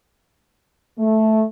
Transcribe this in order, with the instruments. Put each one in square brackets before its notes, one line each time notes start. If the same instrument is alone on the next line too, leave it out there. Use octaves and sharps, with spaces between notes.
[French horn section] A3